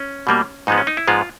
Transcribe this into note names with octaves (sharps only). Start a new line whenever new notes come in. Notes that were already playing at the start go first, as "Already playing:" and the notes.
Already playing: C#4
B2 G3 A#3
G#2 F3 G#3 B3 D#4
C#4
D#4
E4
G#2 F3 G#3 B3 F4